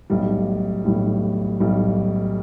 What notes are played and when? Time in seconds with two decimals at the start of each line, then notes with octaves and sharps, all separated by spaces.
0.10 B1 A2 G3
0.85 B1 A2 G3
1.60 B1 A2 G3